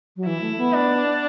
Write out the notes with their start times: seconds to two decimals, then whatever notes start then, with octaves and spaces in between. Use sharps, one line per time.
0.16 F#3
0.26 E3 E4
0.41 A3
0.58 B3
0.74 D4